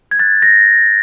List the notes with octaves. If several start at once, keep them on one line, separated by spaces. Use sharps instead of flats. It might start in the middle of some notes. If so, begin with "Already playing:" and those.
G#6
F#6 A6
A#6